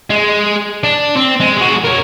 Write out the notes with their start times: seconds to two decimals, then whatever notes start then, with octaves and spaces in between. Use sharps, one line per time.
0.10 G#3
0.84 D4
1.16 C4
1.40 G#3
1.58 G#3 F#4
1.85 A#4 C#5